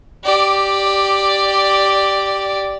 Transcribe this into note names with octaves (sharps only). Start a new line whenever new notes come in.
G4 D5